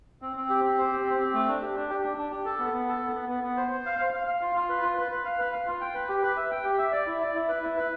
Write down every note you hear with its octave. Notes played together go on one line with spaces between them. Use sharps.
C4
C4
G4
C4
C5
G4
C4
C4
A3
D4
G4
D4
G4
D4
D4
G4
A4
B3
B3
A4
B3
B3
B3
B3
C5
C5
F5
F5
F5
F5
F4
F4
B4
F4
B4
B4
F5
B4
F5
F4
G5
B4
G4
B4
E5
G5
G4
E5
D5
E4
D5
E4
B4
E4
B4